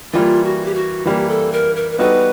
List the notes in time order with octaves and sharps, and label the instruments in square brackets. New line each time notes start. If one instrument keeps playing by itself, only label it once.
[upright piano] E3 G3 A#3 [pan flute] F4
[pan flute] F#4
G4
F#4
[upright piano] E3 G3 A#3 [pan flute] G4
[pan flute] A4
A#4
A#4
A#4
[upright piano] G3 B3 D#4 F#4 A4 [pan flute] B4